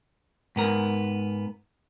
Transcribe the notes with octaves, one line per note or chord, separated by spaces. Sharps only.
G#2 B3 A#4